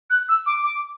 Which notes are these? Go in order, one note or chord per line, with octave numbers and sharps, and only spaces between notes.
F#6
E6
D6
D6